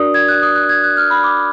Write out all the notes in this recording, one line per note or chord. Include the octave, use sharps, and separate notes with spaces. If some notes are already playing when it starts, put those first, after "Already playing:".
Already playing: D4 F#4 A#4 D5 D#6
G#6
F#6
D#6
F#6
G#6
F#6
F6
B5
D6